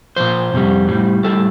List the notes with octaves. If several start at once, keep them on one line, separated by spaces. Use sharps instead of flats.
A#2 F3 C5
F2 C3 G3
A2 G3
A2 G3 A4